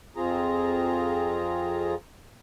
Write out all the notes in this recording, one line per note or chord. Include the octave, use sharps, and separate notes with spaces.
F2 C4 F4 G#4 A#5